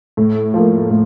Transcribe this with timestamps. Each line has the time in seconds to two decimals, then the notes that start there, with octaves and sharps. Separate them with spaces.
0.17 A2
0.54 F3 A#3
0.90 A2